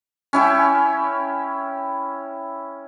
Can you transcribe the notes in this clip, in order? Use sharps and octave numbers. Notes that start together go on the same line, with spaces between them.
C#4 E4 G5